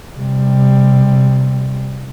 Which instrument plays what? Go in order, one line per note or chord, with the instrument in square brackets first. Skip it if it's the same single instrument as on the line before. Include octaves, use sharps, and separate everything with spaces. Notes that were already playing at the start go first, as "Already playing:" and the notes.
[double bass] C3 G3